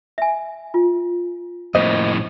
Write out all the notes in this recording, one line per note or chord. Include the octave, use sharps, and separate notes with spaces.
E5 G#5
F4
F2 A2 A#3 C5 D#5